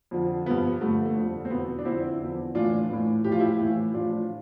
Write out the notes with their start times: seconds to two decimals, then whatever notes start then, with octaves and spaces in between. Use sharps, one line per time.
0.11 F2 D3 F3
0.46 G2 F3 B3
0.81 G2 D3 F3 A3
1.06 A3
1.16 F2 D3 F3
1.45 C4
1.50 E2 B2 B3
1.79 D4
1.85 F2 D3 F3 C4 E4
2.20 E2 D3 F3
2.55 A2 E3 D4 F4
2.90 A2 E3
3.24 A2 F3 G4
3.32 F4
3.39 E4 G4
3.59 A2 E3
3.94 A2 F3 D4 F4